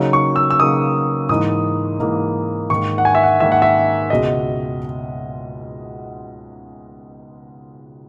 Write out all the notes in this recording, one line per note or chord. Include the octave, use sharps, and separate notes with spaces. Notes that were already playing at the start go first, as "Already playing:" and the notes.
Already playing: C#3 F#3 A#3 D#4
C#6
E6
E6
C#3 F#3 A#3 D#4 D#6
G#2 E3 A#3 D#4 D#6
G#2 E3 A#3 D#4
G#2 D#3 A#3 C#6
F#5
G#5
E5
F#5
G#2 D#3 A#3 E5
F#5
E5
C#2 B2 G#3 D#5